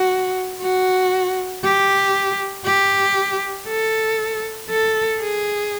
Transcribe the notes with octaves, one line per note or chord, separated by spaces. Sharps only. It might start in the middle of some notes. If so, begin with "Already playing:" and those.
Already playing: F#4
F#4
G4
G4
A4
A4
G#4